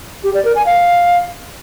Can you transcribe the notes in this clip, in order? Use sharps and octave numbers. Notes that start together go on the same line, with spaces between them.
G4
D5
A#4
G#5
F5